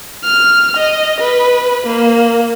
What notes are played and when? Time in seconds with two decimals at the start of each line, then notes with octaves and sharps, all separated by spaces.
0.24 F6
0.77 D#5
1.21 B4
1.87 A#3